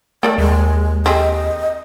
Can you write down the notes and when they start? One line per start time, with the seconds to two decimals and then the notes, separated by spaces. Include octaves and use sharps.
0.23 A3 A#4 C#5 D5 G5
0.38 D#2 G#3
1.06 C4 G4 G#4 D#5